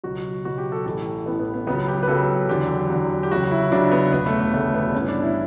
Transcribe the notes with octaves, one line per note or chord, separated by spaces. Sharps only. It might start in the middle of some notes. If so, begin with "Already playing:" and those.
C#2 B2 F#3 F#4
C#2 B2 F#3 F#4
G4
A4
A1 A2 E3 A4
A1 A2 E3 B3
B3
B3
C#2 C#3 F#3 B3
G4
B4
C#2 C#3 F#3 A4
E2 D3 F#3 G4
E2 D3 F#3
G4
C#2 C#3 F#3 F#4
E4
C#2 C#3 F#3 D4
B3
E1 D2 C#3 B3
A3
A3
E1 D2 C#3 A3
B3
G1 G2 E3 C#4
D4
E4